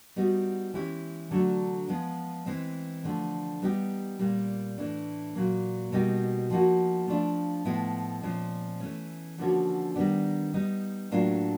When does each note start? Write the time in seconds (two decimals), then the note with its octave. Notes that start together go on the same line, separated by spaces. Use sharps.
0.16 G3 B3 D#4 F#4
0.74 E3 G#3 C#4 E4 G4
1.31 D3 F#3 A3 D4
1.88 F3 G#3 B3
2.46 E3 G#3 C4
3.04 D3 F3 A3
3.62 G3 B3 D#4 G4
4.19 A#2 G3 A#3
4.78 A2 E3 A3 D4
5.35 A#2 F#3 A#3
5.92 B2 G3 A#3 D#4 G4
6.50 F3 A#3 D#4 F#4
7.08 F3 A3 D4 F4
7.65 A2 F3 G#3 B3 E4
8.23 A#2 F3 G#3 C#4
8.80 E3 A3 C#4
9.38 D3 F3 A#3 C#4 F#4
9.96 D#3 G3 B3 D4
10.54 G3 B3 D#4
11.11 A2 F#3 A#3 D4 F4